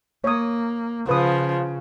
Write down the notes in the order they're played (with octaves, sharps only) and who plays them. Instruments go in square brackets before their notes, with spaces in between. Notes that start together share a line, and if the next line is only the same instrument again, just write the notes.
[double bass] A#3 [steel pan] C#5 D#6
[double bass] C#3 [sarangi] F3 [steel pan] B4 D#6